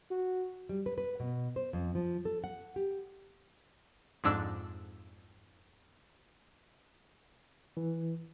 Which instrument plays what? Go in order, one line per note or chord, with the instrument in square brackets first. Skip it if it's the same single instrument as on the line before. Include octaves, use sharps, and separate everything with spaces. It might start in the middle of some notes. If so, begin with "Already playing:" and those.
[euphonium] F#4
[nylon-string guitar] G3
B4
B4
B2
C5
F2
F3
A4
F#5
G4
[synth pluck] F2 G#2 D4 E6
[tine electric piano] E3